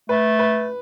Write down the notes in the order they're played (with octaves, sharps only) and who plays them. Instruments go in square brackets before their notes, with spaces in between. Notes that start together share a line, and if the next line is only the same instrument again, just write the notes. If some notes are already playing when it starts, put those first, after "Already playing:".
[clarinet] A3 [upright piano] B4
[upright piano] B4